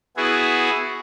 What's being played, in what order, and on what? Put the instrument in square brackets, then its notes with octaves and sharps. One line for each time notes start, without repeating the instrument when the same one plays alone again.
[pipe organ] B3 E4 F#4 G#4